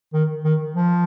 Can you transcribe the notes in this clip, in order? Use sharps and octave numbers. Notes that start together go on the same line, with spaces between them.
D#3
D#3
F3